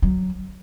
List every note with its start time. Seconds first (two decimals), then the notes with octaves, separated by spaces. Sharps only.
0.02 F#3